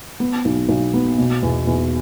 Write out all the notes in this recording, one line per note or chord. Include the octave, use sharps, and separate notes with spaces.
B3
B1
B1
B3
B2
E2
E2